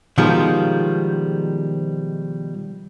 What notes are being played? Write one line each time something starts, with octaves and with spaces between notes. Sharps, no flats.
B2 D#3 F3 G3 G#3